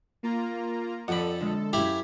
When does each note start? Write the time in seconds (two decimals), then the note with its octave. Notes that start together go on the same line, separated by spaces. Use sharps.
0.23 A#3 F4 A#5
1.08 F2 A4 D5 F#5 B5
1.41 D3 G#3
1.73 F#2 E4 G4 F5 G#6 B6